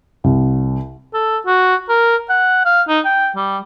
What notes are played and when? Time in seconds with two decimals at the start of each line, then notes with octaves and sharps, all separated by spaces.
0.24 C2
1.14 A4
1.46 F#4
1.89 A#4
2.29 F#5
2.65 F5
2.88 D#4
3.05 G5
3.36 G3